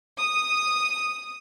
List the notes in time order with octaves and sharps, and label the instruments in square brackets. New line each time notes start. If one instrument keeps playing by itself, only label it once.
[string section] D#6